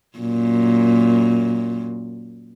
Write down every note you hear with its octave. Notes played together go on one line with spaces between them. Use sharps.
F#2 A#2